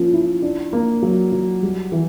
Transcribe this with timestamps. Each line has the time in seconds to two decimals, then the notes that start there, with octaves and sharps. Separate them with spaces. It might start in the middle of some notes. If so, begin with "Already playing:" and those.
Already playing: F3 A#3 C#4
0.13 E4
0.42 D4
0.73 A#3
1.02 F#3
1.32 F#3
1.63 G3
1.92 E3